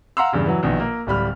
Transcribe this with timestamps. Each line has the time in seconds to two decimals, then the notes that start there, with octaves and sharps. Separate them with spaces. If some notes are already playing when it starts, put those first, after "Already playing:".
0.17 F5 F#5 A#5 C6 E6
0.33 E2 G2 C#3
0.46 E3 F#3
0.63 A#1 B2 D#3
0.80 A#3
1.07 D1 G3 B5 F6